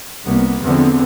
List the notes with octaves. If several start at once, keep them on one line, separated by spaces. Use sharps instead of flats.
C2 A#3 B3
E2 D3 F3 B3 C4